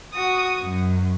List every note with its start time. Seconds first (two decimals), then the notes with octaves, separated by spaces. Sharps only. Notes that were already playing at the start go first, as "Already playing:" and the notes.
0.13 F#4 D#6
0.60 F#2